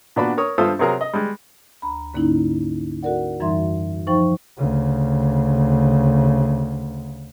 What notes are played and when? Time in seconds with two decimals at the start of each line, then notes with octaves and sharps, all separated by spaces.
0.16 A#2 B3 D4 F#4 B5
0.37 A#4 C#5 D#6
0.58 G2 F4 A4 C5 E5 D#6
0.79 C3 F#3 G#4 A#4 A#5
1.01 D#5
1.13 G3 G#3
1.82 D2 A#5 B5
2.14 G#2 D3 A#3 C#4 D#4 E4
3.03 F#4 A4 A#4 D5 F#5
3.40 F#2 E3 G3 D#4 E5 C6
4.07 F3 D#4 C5 G5 C#6
4.57 D2 C#3